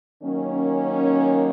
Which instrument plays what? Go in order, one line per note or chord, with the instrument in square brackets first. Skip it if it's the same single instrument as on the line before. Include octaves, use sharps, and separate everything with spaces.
[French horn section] D#3 F#3 A#3 C#4